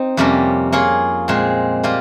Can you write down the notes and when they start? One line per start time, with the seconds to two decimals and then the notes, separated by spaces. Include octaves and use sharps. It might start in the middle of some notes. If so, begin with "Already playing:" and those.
Already playing: C4 D#4
0.17 F2 C3 G3 A#3 C#4
0.72 A#3 F4 G#4 C#5
1.28 A#2 G#3 C4
1.83 G3 A#3 F4